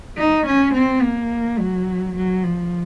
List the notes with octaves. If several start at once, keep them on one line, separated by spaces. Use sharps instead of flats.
D#4
C#4
C4
A#3
F#3
F#3
F3